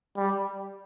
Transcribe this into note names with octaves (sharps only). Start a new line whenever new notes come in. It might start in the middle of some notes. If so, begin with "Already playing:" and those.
G3